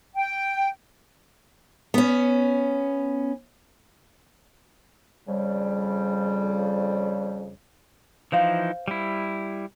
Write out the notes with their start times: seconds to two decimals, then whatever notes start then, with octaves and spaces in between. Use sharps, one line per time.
0.15 G5
1.94 B3 C#4
5.28 F2 C#3 G3
8.32 E3 F3 D#4 C5 F5
8.88 G3 E4